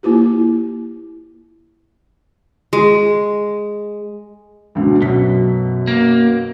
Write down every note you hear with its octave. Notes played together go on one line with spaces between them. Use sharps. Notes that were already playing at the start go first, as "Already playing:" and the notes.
A#3 E4 F4 G4
G#3
D2 B2 D3
B1 F#2 B2 B6
A#3